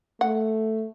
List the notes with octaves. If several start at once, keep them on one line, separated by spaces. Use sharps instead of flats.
A3 F#5